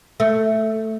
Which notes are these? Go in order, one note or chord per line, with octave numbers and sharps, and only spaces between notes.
A3